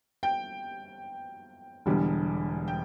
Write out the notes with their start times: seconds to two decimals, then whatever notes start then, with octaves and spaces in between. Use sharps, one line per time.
0.23 G5
1.86 E1 E2 D3 G3
2.68 G5